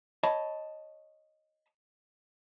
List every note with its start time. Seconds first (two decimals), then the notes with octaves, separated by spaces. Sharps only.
0.23 C#5 D#5 A5 B5